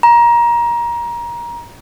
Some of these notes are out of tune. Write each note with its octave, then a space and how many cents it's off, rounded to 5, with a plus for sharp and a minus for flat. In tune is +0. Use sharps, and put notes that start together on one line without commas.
A#5 +25